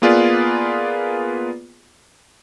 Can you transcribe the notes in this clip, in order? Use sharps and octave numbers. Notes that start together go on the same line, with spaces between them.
A#3 B3 F4 G#4 B4 D5